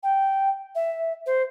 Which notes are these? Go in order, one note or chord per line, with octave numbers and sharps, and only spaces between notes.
G5
E5
C5